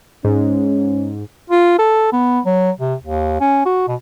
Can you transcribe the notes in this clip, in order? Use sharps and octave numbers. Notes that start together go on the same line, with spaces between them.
G#2 C#4
F4
A4
B3
F#3
C3
D#2
C#4
F#4
B2